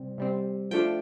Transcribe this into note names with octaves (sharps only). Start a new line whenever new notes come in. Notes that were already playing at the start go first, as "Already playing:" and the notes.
Already playing: C3 G3 C4
C3 G3 C4
F3 A3 D4 F4 G5